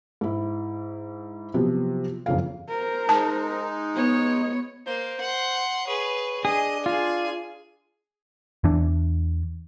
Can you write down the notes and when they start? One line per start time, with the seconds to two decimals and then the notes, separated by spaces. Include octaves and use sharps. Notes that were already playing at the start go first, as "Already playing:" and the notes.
0.21 G#2 E4
1.54 C3 F3 F#3 B3
2.26 F#1 F2 C#3 A#3 F5
2.69 A#4 C5
3.09 G#3 D#4 A5
3.95 B3 C#5
4.87 A#3 C5
5.21 F#5 C6
5.87 G#4 B4 C#5
6.45 D4 G#4 D#5
6.86 F4 G#4 G#5
8.64 E2 E3 D4